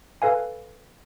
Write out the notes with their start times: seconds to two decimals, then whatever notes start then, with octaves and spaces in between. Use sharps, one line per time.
0.22 A4 B4 F5 G#5